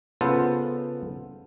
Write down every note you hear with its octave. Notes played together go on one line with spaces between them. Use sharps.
C#3 B3 F4 A4 B4 C5